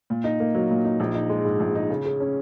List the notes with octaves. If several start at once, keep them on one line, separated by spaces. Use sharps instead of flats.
A#2
D#4
A#3
F#3
A#2
D#4
A#1
D#4
G#3
G#2
A#1
D#4
C#3
C#3
C#4